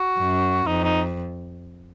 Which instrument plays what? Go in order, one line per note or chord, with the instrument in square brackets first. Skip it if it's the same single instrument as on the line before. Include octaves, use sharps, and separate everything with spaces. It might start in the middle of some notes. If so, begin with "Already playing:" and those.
Already playing: [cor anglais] F#4
[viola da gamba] F#2
[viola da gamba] F2 [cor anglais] D#4
[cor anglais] D#4